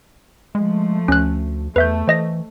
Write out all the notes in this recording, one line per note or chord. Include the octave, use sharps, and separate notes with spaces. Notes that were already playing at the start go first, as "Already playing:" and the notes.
F3 G#3 A3
D2 C#4 F#6
E2 A3 B4 E5 G6
E3 C5 D#5 A#6